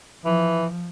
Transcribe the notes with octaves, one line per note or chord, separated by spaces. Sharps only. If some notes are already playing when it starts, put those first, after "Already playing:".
E3 F3